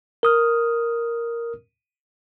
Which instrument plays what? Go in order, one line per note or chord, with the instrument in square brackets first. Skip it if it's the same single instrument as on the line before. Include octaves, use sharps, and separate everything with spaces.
[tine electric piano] A#4 D#6 F6